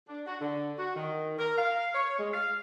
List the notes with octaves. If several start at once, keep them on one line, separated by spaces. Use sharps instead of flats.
D4
F#4
D3
F#4
D#3
A#4
F5
C#5
G#3
F5